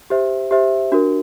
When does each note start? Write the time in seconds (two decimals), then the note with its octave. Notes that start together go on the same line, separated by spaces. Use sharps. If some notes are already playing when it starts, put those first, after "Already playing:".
0.10 G4 C5 E5
0.51 G4 C5 E5
0.92 D4 F#4 A#4